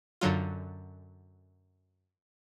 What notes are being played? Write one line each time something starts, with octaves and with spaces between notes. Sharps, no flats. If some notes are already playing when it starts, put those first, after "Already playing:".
F#2 D3 F#3 F4